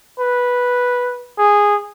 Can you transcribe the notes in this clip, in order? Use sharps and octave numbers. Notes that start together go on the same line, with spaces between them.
B4
G#4